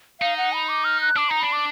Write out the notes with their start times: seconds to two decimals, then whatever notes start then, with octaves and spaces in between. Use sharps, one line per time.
0.21 D#4 F5
0.37 F#5
0.53 B5
0.69 D6
0.84 F6
1.01 F#6
1.16 D4 D6
1.29 D#4 A#5
1.41 D4 B5
1.52 D6